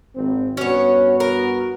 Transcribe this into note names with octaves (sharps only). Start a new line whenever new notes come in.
G#1 C4
G2 B3 C#4 F#4 C#5
A#4